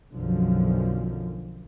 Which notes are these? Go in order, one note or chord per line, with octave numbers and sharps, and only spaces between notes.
B1 F#2 D3 F3